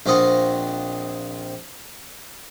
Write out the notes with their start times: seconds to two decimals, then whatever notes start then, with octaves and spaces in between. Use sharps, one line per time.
0.06 A#1 C4 F4 D#5 F#5 C6